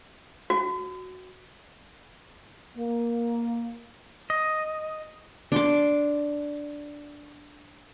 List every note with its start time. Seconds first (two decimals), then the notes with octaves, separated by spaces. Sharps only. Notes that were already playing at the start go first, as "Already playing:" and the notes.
0.50 F#4
2.77 A#3
4.30 D#5
5.52 D4 C6 D6